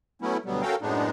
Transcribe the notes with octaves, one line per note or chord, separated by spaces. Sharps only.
F#3 A3 B3 C#4 E4
D2 B2 F#3 G3 B3
C#4 F#4 A4 A#4 F5 G5
F#2 A2 G#3 B3 D4 D#4